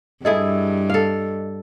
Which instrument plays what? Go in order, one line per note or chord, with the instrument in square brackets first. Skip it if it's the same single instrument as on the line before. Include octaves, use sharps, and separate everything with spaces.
[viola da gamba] G2 [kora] E4 G#4 A4 [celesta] D#5
[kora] A4 F5